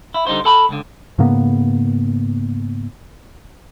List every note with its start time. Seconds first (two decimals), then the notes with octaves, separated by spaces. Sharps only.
0.14 E4
0.27 D3 G3 D#4 C5
0.45 A4 A5 B5
0.69 C#2 D3
1.19 G#2 C#3 A#3 B3